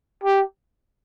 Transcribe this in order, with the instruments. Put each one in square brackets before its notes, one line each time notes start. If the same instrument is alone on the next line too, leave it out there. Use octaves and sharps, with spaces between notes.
[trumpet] G4